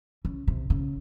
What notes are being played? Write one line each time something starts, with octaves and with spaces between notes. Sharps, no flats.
C#3
C3
C#3